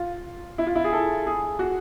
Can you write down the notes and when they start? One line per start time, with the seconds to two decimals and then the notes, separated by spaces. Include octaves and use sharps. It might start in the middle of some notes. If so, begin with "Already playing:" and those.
Already playing: F4
0.58 E4
0.67 F4
0.75 E4
0.84 G#4
0.93 A4
1.27 G#4
1.59 F#4